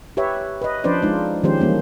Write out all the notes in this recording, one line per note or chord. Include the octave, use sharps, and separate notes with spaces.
G4 B4 C#5 E5
B4 D#5
F3 C#4 D4 B4 C5 D5
G#3 D4 D#4 F4
D#3 F3 G#3 C#4 G4 C5
E3 G3 A#3 C#4